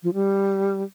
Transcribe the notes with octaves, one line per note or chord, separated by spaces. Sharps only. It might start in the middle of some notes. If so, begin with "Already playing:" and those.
F3
G3